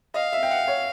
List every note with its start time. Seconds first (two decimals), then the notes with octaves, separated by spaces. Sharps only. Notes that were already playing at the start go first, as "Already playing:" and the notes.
0.14 D#5 F5
0.33 E5
0.43 G5
0.51 F#5
0.68 C#5